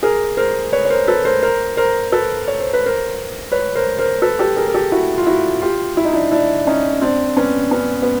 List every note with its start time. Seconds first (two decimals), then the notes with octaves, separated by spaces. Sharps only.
0.03 G#4 A#4
0.37 A#4 C5
0.73 B4 C#5
0.85 C#5
0.90 A#4 C5
1.07 A4 B4
1.25 A#4 C5
1.42 A#4 C5
1.77 A#4 C5
2.12 A4 B4
2.48 C#5
2.60 C5
2.73 B4
2.86 A#4 C5
3.52 B4 C#5
3.75 A#4 C5
3.99 A#4 C5
4.22 A4 B4
4.39 G4 A4
4.56 G#4 A#4
4.67 A#4
4.74 G4 A4
4.92 E4 F#4
5.18 F4
5.26 E4 F#4
5.62 F4 G4
5.97 E4
6.05 D#4
6.13 D4 E4
6.32 D4 E4
6.67 C#4 D#4
7.01 C4 D4
7.37 B3 C#4
7.71 B3 C#4
8.02 B3